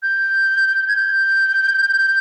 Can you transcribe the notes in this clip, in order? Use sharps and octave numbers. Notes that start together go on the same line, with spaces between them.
G6
G#6
G6